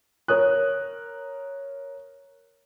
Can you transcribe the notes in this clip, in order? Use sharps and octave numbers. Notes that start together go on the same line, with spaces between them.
A#4 C#5 D#6 F#6